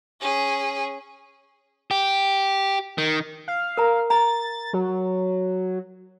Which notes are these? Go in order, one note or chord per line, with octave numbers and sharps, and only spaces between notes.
C#4 G#4
G4
D#3
F5
A#4 A#5
A#5 A6
F#3